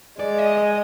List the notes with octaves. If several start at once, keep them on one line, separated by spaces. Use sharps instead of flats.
G#3 D5
D#5
D#5